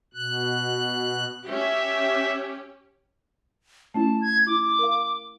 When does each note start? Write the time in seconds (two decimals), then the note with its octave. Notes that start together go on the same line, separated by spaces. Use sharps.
0.14 B2 F#6
1.47 C#4 G4 E5
3.94 A3 C#4 E4 A5
4.21 G#6
4.47 E4 D6
4.79 A#4 F5